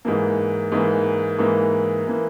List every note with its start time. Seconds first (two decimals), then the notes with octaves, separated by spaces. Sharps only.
0.05 G#2 E3 A#3
0.72 G#2 E3 A#3
1.38 G#2 E3 A#3
2.07 E3 A#3